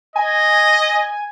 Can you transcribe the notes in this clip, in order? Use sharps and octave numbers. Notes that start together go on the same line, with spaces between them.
D#5 G#5